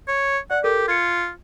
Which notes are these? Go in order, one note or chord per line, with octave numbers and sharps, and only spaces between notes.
C#5
D5 F#5
G4 A4 A#4
F4 G#6 C#7